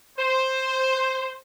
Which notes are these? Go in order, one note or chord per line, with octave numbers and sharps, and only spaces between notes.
C5